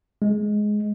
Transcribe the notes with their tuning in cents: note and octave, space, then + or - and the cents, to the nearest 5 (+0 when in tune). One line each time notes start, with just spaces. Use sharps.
G#3 +10